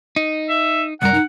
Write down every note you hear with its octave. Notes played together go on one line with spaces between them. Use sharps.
D#4
E5
C2 F#2 G3 A#4 F#5
D#4